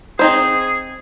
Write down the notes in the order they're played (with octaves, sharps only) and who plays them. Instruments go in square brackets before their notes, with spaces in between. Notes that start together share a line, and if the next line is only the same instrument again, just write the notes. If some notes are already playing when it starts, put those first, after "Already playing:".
[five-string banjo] C4 D#4 C5 [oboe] G#4